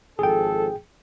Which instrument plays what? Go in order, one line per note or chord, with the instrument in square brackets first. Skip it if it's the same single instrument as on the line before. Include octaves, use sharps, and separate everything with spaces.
[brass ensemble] G#1 F3 A4 [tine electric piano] G#4 G5